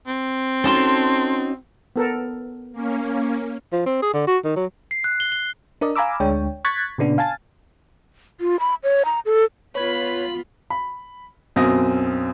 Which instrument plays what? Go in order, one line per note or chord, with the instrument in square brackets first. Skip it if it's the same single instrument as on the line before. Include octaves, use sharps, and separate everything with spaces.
[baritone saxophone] C4
[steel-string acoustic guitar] C#4 D#4 F#4 [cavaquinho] A4 A5 C6
[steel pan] B3 A4 A#4
[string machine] A#3 C#4
[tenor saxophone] F3
C4
G#4
D3
F#4
D#3
F#3
[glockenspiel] C7
F#6
G7
G7
[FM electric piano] D4 A#4 D5 D#5
F5 G#5 A#5 B5 D6 E6
D2 G#3 D4 C#5 G5
C#6 F#6 G#6 A6 B6
A#2 C#3 B3 D4
F5 G#5 A5 A6
[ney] F4
B5
C#5
A#5
A4
[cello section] B3 F4 [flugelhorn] B4 [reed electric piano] C#5 G#6 [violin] B5 B6
[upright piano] B5
B1 F#2 B2 C4 D#6 A#6